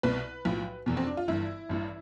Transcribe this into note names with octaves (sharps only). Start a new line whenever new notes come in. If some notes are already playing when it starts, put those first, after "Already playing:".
C2 B2 B4
B1 A2 F3
F1 E2 B2
C4
D4
F4
G1 G2 E3 E4
A1 G2 E3